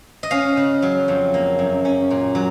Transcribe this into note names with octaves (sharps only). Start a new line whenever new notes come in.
D#5
C#4 F5
C#3
F#3
F2
A#3
F#2
C#4
A#2
F#3